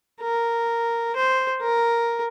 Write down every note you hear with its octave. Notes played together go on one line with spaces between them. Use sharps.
A#4
C5
A#4